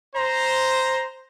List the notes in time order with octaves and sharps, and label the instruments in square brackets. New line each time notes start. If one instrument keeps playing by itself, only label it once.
[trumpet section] C5 A#5